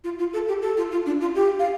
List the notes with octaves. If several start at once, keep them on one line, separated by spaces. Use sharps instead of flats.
F4
F4
A4
G4
A4
F4
F4
D4
F4
G4
F5